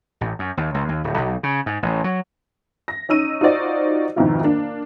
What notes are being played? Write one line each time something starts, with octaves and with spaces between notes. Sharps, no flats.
A1
F#2
D#2
C#2
D#2
D1
B1
C#3
G#2
A1
F#3
A#6
C#4 D#4 E6 D#7
D#4 F4 F#4 C5 D5 D#5
F2 G#2 B2 D#3 E4 F4
A#3 D4